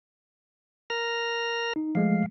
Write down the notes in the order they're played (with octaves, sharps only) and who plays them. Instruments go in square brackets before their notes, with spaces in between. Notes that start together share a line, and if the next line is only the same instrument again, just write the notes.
[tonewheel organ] A#4 F6 A#6
[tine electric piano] D#4
[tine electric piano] F3 G#3 A3 [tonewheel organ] F5